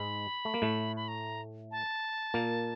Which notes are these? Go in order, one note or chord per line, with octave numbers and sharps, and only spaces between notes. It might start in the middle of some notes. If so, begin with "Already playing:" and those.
Already playing: G#2 G#3 B5
A3
A#3
A2 A3
B5
A#5
A5
A#2 A#3